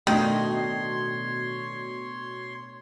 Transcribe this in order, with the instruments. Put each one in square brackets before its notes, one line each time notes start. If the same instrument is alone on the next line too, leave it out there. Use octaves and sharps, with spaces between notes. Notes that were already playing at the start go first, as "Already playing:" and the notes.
[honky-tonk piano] B2 [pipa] D#3 [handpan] A3 D4 D#5 [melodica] C#5 C6